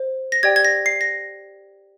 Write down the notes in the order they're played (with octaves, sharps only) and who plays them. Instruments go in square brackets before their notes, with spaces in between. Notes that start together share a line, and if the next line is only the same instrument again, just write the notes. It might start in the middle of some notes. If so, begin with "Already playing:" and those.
Already playing: [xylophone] C5
A#6
G4 D5 G5 G#6
G#6
A#6
C7
A#6